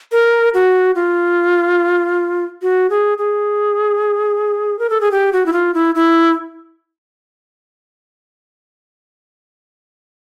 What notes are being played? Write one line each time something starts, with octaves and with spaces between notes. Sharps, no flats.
A#4
F#4
F4
F#4
G#4
G#4
A#4
A4
G#4
G4
F#4
E4
F4
E4
E4